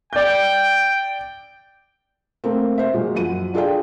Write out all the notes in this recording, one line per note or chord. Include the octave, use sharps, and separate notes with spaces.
D5 G5 G6
A3 A#3 C4
C5 E5
A#2 F#3 G#3
F#2 F3 F#5 D#7
D4 F4 G#4 A4 D5 G5